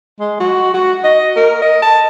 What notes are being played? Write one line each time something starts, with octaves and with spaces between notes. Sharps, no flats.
G#3
F#4
F#4
D#5
A#4
D#5
A5